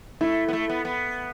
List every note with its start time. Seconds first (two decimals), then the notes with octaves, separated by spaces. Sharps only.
0.21 A3 E4
0.48 B3
0.53 A3
0.70 B3
0.85 B3